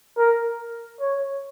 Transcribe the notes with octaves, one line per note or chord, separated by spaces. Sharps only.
A#4
C#5